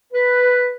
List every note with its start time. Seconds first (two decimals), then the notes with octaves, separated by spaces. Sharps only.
0.13 B4